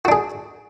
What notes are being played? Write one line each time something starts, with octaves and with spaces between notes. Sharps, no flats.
D4 F#4 G#4